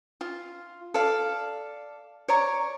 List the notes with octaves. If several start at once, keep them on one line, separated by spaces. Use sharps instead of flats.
F4
A4 D5 F5
C#5 D5 A#5 C#6